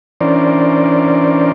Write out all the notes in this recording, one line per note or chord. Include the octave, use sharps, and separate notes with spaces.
E3 C#4 D4 A#4 C5 D5